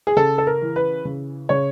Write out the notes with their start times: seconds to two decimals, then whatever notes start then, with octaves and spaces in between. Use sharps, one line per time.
0.07 G#4
0.16 C#3 A4
0.38 A4
0.47 A#4
0.62 E3
0.76 B4
1.05 C#3
1.49 C#3 C#5